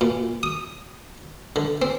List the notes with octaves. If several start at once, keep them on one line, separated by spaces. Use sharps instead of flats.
A#2
D#6
D3
C4